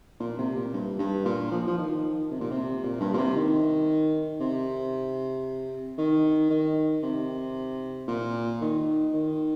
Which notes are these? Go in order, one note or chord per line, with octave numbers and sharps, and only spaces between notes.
A#2
C3
A#2
G2
G2
A#2
F3
F3
D#3
C3
A#2
C3
A#2
G2
A#2
C3
D#3
C3
D#3
D#3
C3
A#2
D#3
D#3